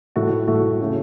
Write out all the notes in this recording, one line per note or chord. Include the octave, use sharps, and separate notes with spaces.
A2 A3 F#4
A2 A3 F#4
C#3 A3 C#4 F#4